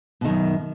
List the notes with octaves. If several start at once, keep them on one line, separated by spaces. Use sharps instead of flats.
F#2 B2 D#3